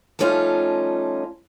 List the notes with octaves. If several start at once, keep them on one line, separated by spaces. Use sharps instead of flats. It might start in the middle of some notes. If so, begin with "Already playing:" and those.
F3 G3 A3 C#4 D#4 F4